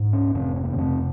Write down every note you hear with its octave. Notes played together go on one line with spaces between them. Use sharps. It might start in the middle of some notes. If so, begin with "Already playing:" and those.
Already playing: G#2
C#4
F2 C3 C4
C4
A#3
B3
F2 C3 C4